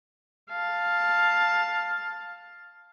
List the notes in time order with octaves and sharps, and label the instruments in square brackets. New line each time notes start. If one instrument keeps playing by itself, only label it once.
[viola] F5 A5